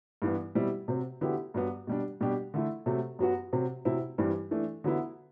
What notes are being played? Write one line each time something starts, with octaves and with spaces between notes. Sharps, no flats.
G2 E3 B3
B2 G3 C4 E4 G4
C3 F#3 C4
D3 F#3 B3 E4 G4
G2 F#3 B3
B2 G3 D4
B2 G3 D4 G4
D3 A3 E4
C3 F#3 A3
F#2 F#3 B3 F#4
C3 F#3 C4
C3 F#3 C4 E4
G2 E3 G3 C4
E3 A3 D4
D3 F#3 B3 E4